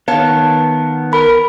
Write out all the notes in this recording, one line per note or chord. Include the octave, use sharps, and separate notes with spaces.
D#3 B3 C#5 F5 A5
A#4 B5